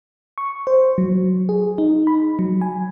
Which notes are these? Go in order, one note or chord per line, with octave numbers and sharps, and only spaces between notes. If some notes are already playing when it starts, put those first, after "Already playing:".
C#6
C5
F#3
G#4
D#4
B5
F#3
G#5